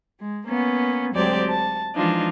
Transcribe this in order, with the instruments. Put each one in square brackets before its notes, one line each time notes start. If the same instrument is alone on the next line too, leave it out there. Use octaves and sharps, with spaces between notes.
[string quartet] G#3
A#3 B3 C#4
D2 F#3 G#3 C4 G4 D5
A5
E3 F3 G#3 D4 D#4 F4